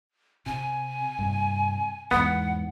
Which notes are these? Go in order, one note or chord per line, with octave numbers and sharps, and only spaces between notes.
C3 G#5
G2 C3
E2 G#2 B3 F#5